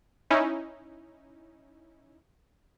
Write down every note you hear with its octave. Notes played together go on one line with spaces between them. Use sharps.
C#4 D#4 E4